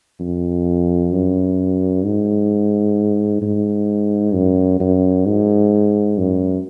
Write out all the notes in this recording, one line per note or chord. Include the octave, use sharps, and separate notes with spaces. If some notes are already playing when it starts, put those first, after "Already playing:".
F2
F#2
G#2
G#2
F#2
F#2
G#2
F#2